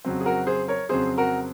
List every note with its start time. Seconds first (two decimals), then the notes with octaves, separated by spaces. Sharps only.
0.05 F2 C#3 F#3 C4
0.21 G#4
0.26 F#4 A#4
0.47 G#4 C5
0.68 A#4 C#5
0.89 F2 C#3 F#3 C4 G#4 C5
1.18 F#4 A#4